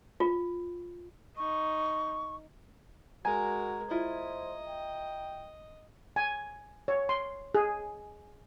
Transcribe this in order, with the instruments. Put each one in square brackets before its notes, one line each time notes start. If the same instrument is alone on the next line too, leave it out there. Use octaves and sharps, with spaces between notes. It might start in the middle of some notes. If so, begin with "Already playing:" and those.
[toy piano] F4
[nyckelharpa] D#4 [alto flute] C#6
[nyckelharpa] G#3 A#4 [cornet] F#4 [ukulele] G#5 [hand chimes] A#5 G#6
[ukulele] E4 F4 [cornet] C5 [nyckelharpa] D#5
[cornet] G5
[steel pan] G#5
C#5
C6
G#4